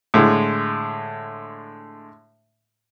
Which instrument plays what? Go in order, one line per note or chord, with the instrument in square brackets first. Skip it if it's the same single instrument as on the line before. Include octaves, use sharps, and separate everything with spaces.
[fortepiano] A2 D3 G#3